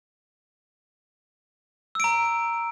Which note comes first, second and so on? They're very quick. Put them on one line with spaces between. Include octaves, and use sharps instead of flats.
E6 D7 A#5